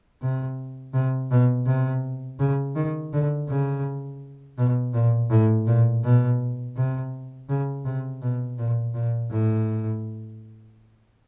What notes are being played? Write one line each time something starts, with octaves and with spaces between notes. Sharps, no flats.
C3
C3
B2
C3
C#3
D#3
D3
C#3
B2
A#2
A2
A#2
B2
C3
C#3
C3
B2
A#2
A#2
A2